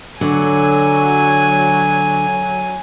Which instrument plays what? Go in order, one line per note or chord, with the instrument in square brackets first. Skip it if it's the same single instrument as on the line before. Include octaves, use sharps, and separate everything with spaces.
[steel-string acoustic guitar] D3 [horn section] F#3 [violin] G#5